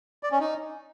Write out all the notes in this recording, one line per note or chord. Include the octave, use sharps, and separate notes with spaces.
D5
C#4
D#4